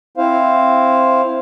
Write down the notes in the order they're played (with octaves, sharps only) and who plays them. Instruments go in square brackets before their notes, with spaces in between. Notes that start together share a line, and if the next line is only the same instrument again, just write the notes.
[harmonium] C4 E4 C5 F5